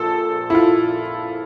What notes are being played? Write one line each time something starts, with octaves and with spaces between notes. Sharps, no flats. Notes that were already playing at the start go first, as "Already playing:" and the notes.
Already playing: A#1 A#2 F3 A4
E4
F4